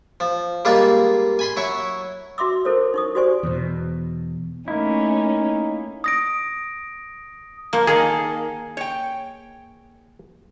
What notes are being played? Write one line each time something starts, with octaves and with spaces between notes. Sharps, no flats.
F3
G3 G#3 A#3 F4
G#5 B5 C6
F#3 E4 C#6
F#4 E5 C6 D6 E6
E4 A4 A#4 C5 C#5
D#4 C#6 D#6
F#4 G4 C5 D5 G#5 C#6
E2 B2
A3 A#3 C#4 D#4 E4
D#6 A#6 D7
F3 A#3
D#3 A#3 G#4 A4 A#5
C#5 G5